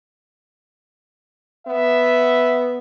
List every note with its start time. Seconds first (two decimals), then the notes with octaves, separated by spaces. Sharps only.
1.67 B3 E5